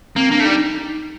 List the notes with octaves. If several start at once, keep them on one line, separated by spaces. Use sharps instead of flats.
A#3 C4
A#3 D4
A3
G3 D#4